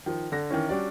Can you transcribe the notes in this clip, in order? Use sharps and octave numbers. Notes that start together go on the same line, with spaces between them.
D#3 F3
D3 A#6
D#3 E3 C#4
G3 C#4 D4 F#4 D5